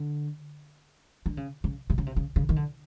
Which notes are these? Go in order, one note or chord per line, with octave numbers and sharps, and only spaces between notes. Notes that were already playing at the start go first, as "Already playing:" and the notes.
Already playing: D3
D3
C#3
C#3
C3
C#3
C3
C#3
C#3
D#3
D3